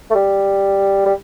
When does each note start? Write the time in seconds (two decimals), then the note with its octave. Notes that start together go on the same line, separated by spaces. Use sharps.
0.10 A3
0.15 G3
1.06 G3